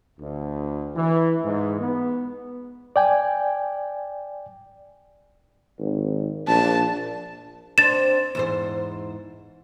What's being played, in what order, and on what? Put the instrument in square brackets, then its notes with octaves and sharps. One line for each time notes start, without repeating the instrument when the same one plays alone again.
[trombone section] D2
E3
G#2
B3
[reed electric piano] D5 G5 G#5
[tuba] G#1
[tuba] A#1 [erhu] A5
[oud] C4 D4 [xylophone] A6 E7
[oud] E2 G#2 C5